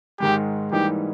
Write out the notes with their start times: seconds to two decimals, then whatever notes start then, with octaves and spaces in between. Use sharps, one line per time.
0.20 G#2 D#3 G#3 G4
0.72 G#2 E3 G3 A#3 D#4 G4